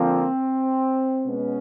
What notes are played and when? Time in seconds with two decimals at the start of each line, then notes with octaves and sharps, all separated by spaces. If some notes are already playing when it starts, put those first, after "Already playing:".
Already playing: D3 F3 A#3 C4
1.24 B2 G#3 B3 C#4